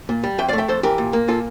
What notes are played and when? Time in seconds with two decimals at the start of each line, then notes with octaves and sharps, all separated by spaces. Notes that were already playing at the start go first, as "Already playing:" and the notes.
0.09 A#2
0.24 G3
0.38 F2 E5 G5
0.48 D5 F5
0.53 A3
0.58 E5 G5
0.68 F2 A4 C5
0.83 E3 G4 A#4
0.98 A#2
1.13 A#3
1.28 A#2 F4 A4